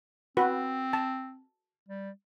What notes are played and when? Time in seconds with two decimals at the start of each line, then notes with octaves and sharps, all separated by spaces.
0.37 C4 F#4 B4
0.93 A5
1.88 G3